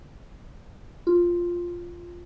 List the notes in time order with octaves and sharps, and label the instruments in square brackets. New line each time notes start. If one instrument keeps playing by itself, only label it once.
[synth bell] F4